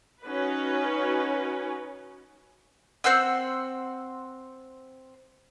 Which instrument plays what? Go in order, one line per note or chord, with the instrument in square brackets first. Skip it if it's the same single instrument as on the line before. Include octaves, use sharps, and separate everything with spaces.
[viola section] C#4 D#4 F#4 B4
[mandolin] C4 C5 F#5 E6